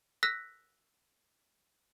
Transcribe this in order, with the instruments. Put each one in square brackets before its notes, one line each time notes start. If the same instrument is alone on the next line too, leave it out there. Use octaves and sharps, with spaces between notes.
[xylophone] E6 F#6 A#6 B6